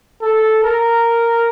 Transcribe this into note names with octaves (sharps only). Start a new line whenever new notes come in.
A4
A#4